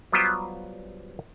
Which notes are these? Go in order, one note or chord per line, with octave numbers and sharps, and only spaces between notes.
F#3 G3 B3 F4 G4 C5